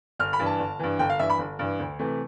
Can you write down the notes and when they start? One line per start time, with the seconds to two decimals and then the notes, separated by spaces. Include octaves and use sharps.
0.19 G1 F6
0.33 B5
0.39 G2 E3
0.46 A5
0.59 G1
0.79 G2 E3
0.99 G1 G5
1.10 F5
1.19 G2 E3 E5
1.30 B5
1.39 G1
1.59 G2 E3
1.79 D2
1.99 C3 E3 A3